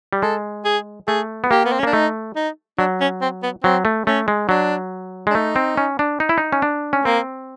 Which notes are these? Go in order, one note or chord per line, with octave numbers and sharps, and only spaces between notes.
G3
G#3 A4
G#4
A3 G#4
B3
A#3 G4
B3
C4
C#4
A#3 D4
A3 D#4
D#4
F#3 D4
C#4
C4
B3
F#3 C4
A3
A3 C#4
G#3
F#3 D4
G#3
D4
A3 D#4
C4
C#4
D4
D#4
E4
D#4
C#4
D4
C#4
A#3 C4